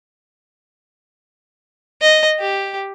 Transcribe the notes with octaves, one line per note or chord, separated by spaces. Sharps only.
D#5
G4